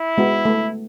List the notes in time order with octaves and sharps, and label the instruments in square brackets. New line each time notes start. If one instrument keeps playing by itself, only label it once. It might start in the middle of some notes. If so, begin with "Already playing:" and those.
Already playing: [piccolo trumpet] E4
[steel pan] G#3 B3 F#4
A3